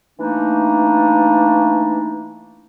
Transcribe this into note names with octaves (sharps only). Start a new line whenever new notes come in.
E3 A3 A#3 D4 D#4